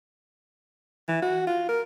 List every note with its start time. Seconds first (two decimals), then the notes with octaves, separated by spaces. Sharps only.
1.08 E3
1.22 F#4
1.47 F4
1.69 A#4